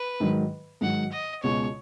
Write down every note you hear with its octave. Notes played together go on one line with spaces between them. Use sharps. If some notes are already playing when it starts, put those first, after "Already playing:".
Already playing: B4
G#2 D#3 F#3
G#2 D#3 F#3 F#5
D#5
C#2 B2 G#3 C#5